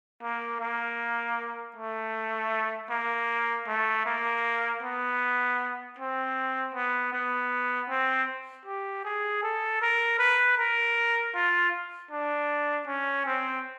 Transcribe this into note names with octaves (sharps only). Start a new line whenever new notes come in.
A#3
A#3
A3
A#3
A3
A#3
B3
C4
B3
B3
C4
G4
G#4
A4
A#4
B4
A#4
F4
D4
C#4
C4